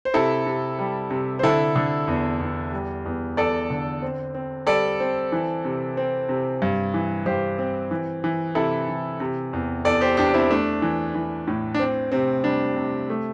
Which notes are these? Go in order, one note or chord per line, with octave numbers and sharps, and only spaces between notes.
C5
C3 E4 A4
C3
G3
C3
C5
D3 E4 A4
D3
E2
E2
G3
E2
E2 A4 D5
D3
C4
C4
G3 A4 D5
C4
E3
C3
C4
C3
G2
E3
G2 G4 C5
C4
E3
E3
C3 E4 A4
E3
C3
E2
E2 A4 D5
G4 C5
E2 D4 G4
C4 E4
A3 D4
E3
E3
A2
D4
C4
C3 C4
G3 D4
C3
A3